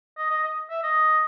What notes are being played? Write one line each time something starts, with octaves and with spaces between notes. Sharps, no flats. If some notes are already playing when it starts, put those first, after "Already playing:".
D#5
D#5
D#5
E5
D#5